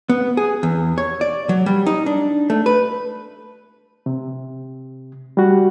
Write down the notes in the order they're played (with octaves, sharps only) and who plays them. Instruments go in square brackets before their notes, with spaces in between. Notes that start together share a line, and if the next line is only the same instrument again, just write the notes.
[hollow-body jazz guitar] B3
G#4
E2
C#5
D5
F#3
G3
D#4
D4
A3
B4
[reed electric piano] C3
G3 F#4